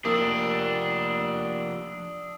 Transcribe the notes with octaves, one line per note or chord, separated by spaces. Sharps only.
F3 A#3 D4 G4 D#6 E6 D7